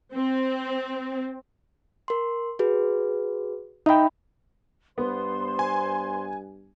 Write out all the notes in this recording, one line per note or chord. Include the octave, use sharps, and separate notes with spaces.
C4
A#4 C6
F#4 G#4 B4
D#4 E5 G5 B5
G2 B3 C5 C6
G#5